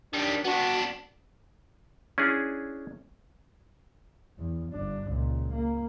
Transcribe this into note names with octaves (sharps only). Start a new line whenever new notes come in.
D#3 G3 D4
B3 D4 F#4
C#4 D4 E4 G#4
E2
G1 D4
C#2 A#2
A#3